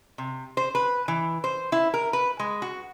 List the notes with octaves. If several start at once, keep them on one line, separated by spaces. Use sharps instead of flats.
C3
C5
B4
E3
C5
E4
A#4
B4
G#3
F#4